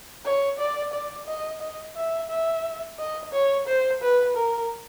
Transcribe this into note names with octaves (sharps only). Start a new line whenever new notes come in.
C#5
D5
D5
D#5
D#5
E5
E5
D#5
C#5
C5
B4
A#4